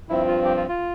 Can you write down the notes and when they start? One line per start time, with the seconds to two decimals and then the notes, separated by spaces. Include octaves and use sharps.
0.09 G2 F3 C4 E4
0.27 F4
0.45 G4
0.57 F4
0.69 F4